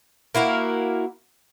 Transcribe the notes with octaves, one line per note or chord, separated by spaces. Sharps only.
A#3 E4 F#4 A#4